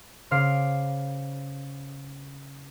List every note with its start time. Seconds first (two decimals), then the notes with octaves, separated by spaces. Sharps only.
0.31 C#3 C5 F5 D6 F6 C7